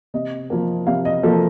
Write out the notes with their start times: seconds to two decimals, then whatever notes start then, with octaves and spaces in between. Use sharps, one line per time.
0.14 C3 D#5
0.50 F3 A#3
0.87 C3 F5
1.05 D#5
1.23 F3 A#3 A4